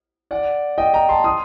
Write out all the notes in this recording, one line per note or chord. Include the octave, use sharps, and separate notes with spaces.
D5 F#5
D#5 G5
G5 A#5
A5 C6
C6 D#6